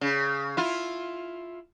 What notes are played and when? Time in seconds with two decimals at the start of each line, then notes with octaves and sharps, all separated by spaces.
0.01 C#3
0.57 E4 F4